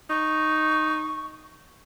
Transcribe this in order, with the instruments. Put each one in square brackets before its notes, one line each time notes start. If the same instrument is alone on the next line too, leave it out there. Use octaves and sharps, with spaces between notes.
[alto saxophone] D#4 [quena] C#6